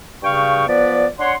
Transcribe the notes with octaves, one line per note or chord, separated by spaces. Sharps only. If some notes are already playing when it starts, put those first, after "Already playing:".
G2 C#3 F5 G5 C#6
F3 B3 B4 D5
D4 C#5 F#5 C6